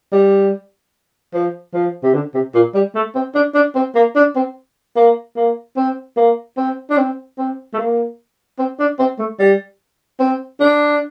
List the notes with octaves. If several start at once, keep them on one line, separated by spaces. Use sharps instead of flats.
G3
F3
F3
C3
D3
C3
A#2
G3
A3
C4
D4
D4
C4
A#3
D4
C4
A#3
A#3
C4
A#3
C4
D4
C4
C4
A3
A#3
C4
D4
C4
A3
G3
C4
D4